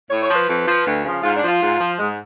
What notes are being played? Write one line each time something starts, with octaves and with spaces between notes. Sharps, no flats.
A2 C#5
C#5
F3
B4
F2
F3
D2
C#3 F3
G#2 F4
D4
F3
F4
G#2
F3
G#2 G#3